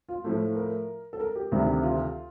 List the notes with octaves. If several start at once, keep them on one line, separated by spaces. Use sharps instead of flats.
F4
A2 F3 A3
A#4
A4
A#4
G4
D2 C3 D#3 G3
F4